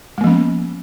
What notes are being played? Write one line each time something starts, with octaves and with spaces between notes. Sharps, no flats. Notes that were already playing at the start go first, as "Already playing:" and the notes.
F3 G#3 A#3 B3 C#4